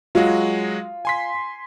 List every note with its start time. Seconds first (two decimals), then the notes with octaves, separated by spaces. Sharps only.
0.15 F#3 G#3 F4 F#4
1.05 G#5 C6 B6